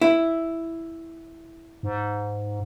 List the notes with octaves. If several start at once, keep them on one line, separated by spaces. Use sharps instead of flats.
E4
G#2